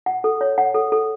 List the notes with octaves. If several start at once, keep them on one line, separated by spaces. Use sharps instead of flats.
F#5
A4
C#5
F#5
A4
A4